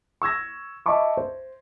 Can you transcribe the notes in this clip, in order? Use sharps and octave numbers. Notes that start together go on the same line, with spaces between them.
C#6 E6 G#6 A#6
D#5 E5 A5 B5 C#6 D6
C5